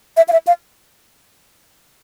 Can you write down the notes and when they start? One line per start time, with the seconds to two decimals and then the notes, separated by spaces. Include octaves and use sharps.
0.17 E5
0.28 F5
0.33 E5
0.47 F5